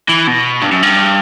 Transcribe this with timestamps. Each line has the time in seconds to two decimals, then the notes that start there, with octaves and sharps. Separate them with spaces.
0.09 E3
0.27 B2
0.62 G2
0.72 F#2
0.83 G2